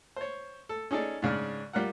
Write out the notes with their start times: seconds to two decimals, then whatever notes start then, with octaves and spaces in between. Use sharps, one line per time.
0.16 C5 C#5
0.69 A4
0.91 C#4 D#4 G#4 A4 D5
1.22 G#2 C#3 D4 F6
1.73 G3 F4 A#4 F#5